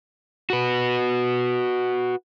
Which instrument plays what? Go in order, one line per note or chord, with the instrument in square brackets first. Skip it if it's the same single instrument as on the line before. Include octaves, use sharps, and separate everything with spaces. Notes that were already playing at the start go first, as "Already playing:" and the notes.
[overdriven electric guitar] F#4 B4